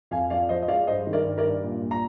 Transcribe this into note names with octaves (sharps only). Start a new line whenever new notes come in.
F2 F5 G#5
F3 D5 F5
F3 C5 D#5
D#5
G#3 D5 F5
G2 C5 D#5
D#3
A#4 D5
G2
A#4 D5
G2
A#2
A#2
A#5